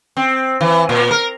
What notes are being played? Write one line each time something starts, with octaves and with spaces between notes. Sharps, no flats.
C4
E3
A#2
A#4